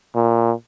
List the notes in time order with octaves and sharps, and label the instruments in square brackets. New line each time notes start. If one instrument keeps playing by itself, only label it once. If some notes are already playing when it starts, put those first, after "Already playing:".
[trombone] A#2